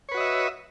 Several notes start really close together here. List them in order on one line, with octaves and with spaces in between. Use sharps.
C#5 B4 F#4 D#5 E5